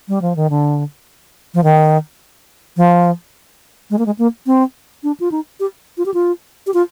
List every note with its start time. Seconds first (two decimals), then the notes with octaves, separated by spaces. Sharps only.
0.08 G3
0.22 F3
0.36 D#3
0.50 D3
1.54 F3
1.64 D#3
2.77 F3
3.90 G#3
3.99 A#3
4.06 G#3
4.18 A#3
4.46 C4
5.03 D4
5.20 F4
5.31 D#4
5.60 G4
5.98 F4
6.06 G4
6.14 F4
6.67 G4
6.74 F4